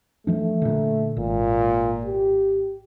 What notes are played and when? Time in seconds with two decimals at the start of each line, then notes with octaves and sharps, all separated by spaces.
0.27 E3 F3 A3 D4
0.62 A#2 D3
1.17 G#1 A#2
2.06 G4